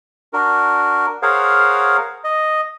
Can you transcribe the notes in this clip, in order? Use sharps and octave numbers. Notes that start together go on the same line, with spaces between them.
D4 F#4 A#4
G#4 A#4 C5 C#5 F5 F#5
D#5